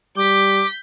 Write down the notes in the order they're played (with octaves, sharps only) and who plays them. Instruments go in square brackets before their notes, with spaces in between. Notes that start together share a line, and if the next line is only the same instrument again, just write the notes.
[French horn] G3 [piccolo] D6 [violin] G6 B6